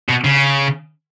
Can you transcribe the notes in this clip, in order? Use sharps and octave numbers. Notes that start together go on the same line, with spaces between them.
B2
C#3